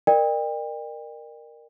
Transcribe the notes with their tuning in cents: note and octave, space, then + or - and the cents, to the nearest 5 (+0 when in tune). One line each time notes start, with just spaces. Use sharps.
A#4 +0 D5 +45 G5 +35